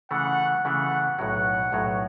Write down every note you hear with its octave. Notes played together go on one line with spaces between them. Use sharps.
C#3 E3 A3 F#5
C#3 E3 A3 F#5
B1 A2 F#3 F#5
B1 A2 F#3